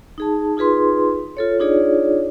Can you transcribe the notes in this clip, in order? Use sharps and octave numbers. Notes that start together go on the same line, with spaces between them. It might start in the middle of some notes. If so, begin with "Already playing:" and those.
D#4 G#4 A5
D#4 F4 G#4 B4 C6
F4 A4 C#5
D4 D#4 F4 G#4 C#5 D5